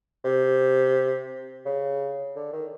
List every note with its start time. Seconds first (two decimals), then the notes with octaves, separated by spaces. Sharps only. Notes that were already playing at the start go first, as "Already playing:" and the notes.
0.24 C3
1.65 C#3
2.35 D3
2.53 D#3